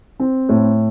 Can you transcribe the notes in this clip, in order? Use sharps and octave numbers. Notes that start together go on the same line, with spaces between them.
C4
A2